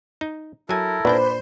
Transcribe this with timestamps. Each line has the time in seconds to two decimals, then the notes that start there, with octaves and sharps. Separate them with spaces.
0.21 D#4
0.69 F#3 E4 A4 A#4 G#5
1.05 A#2 D4 B4 C5 D5 G5 B5